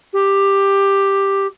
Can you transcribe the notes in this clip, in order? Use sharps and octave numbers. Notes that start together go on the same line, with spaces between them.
G4